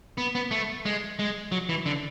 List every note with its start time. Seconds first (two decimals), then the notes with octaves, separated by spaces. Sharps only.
0.18 B3
0.35 B3
0.51 A3
0.85 G#3
1.19 G#3
1.52 F#3
1.69 E3
1.86 D3